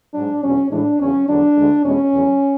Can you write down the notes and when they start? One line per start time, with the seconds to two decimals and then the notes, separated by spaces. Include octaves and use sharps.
0.14 G#2 F#3 D4
0.43 E2 B2 F#3 C#4
0.71 A2 E3 G#3 D4
1.00 E2 C#3 F#3 C#4
1.28 E2 D3 F#3 D4
1.57 D2 D3 G#3
1.85 E2 B2 G#3 C#4
2.14 E2 C#3 F#3